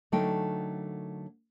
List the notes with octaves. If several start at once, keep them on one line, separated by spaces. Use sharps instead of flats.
D3 F#3 A3 D#4 A#4 G5